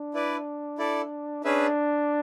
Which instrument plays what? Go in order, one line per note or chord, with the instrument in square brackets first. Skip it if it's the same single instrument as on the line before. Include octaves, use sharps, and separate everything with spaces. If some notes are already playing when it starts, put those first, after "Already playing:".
Already playing: [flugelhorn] D4
[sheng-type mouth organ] E4 B4 D5
E4 A4 D5
[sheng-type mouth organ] C#4 G#4 B4 E5 [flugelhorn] D4